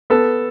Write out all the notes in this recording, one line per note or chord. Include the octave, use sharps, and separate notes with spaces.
B3 A4